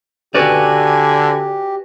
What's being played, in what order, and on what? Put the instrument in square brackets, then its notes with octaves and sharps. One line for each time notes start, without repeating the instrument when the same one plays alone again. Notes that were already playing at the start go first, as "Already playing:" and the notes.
[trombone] D3 [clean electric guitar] F#4 B4 D5 [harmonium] G4 [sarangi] G#5